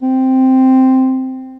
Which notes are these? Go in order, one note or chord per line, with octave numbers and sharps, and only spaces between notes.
C4